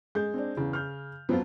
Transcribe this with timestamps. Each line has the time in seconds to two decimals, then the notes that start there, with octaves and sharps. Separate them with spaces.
0.15 G#3 G6
0.34 C4 D4 D5
0.57 E2 C#3
0.73 F6 G6
1.29 F2 F3 F#3 B3 C4 F4